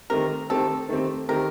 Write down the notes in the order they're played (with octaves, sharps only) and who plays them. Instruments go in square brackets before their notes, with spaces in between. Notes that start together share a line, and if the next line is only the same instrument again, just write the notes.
[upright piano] D#3 A3 C4 G4 [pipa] A#4
[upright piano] D#3 A3 C4 G4 [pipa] A4
[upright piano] D#3 A3 C4 G4
[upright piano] D#3 A3 C4 G4 [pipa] A#4